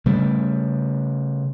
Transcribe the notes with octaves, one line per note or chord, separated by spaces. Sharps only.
C#3 G3 A3